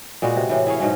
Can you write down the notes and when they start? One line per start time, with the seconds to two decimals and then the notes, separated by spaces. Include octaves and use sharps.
0.22 A#2 G#3 B3 F#4
0.36 C3
0.49 A2 E3
0.67 E4 G#4 C#5 F5
0.80 G#2 B2 F#3 C#4